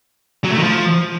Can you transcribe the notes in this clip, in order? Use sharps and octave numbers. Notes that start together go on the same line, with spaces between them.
F#3
A3
D#3
F3